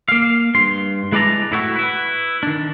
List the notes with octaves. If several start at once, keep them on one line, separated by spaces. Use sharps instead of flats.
A#3 F5
G2 C6
G#3 E4 B4 D5 A5 A#5
A2 E4 F#4
E4 B4
D#3 D4